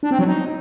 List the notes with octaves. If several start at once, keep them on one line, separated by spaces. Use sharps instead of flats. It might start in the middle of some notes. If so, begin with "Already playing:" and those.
D4
C4
F#3
D#4